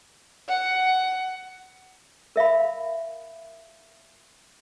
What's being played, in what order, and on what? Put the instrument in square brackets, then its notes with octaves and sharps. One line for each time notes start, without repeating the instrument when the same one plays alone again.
[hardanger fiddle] F#5
[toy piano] A#4 E5 F5 B5